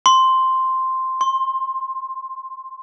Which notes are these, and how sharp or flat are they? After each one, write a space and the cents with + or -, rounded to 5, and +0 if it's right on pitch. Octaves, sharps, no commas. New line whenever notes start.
C6 +0
C6 +25